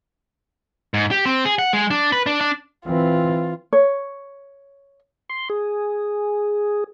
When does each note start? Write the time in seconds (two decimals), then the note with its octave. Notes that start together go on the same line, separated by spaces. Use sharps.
0.94 G#2
1.11 G4
1.26 C4
1.45 G#4
1.59 F#5
1.73 G#3
1.91 D4
2.12 B4
2.26 D4
2.41 D4
2.87 E3 C4 F4
3.73 C#5
5.29 C6
5.50 G#4